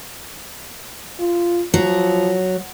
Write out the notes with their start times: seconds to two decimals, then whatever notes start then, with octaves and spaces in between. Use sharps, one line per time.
1.20 F4
1.74 F3 F#3